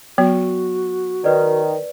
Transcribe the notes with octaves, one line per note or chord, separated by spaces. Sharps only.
F#3 B3 F#4
D#3 B4 D5